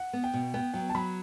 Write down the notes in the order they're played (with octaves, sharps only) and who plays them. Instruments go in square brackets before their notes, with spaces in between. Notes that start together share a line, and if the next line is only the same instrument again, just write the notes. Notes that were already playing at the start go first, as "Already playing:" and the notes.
Already playing: [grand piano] F#5
[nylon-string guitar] B3
[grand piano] G5
[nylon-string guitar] B2
[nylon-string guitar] B3 [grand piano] G5
[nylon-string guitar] F#3 [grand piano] G5
[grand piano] A5
[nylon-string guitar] F#3 [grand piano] B5